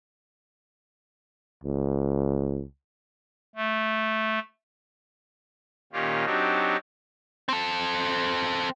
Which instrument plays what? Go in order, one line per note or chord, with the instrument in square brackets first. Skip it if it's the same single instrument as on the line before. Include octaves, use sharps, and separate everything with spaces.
[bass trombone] C#2
[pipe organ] A3
A#2 D#3 C#4 F4 G4
F#3 C4 D4 D#4 F#4 G4
[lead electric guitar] C4 A4